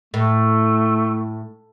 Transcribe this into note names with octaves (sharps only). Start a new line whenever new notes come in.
A2 A3